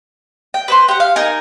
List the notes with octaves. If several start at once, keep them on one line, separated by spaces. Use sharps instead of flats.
G5
B4 C5 C6
G4 F#5
F5
D#4 A#4 G#5